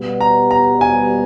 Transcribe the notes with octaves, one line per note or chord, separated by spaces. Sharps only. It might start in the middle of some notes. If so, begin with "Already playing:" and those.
Already playing: B2 G3 B3
A#5
A#5
G#5